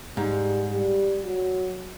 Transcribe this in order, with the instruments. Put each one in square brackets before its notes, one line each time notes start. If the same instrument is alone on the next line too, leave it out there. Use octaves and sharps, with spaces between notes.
[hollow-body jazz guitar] G#2 [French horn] G3
[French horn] G3
F#3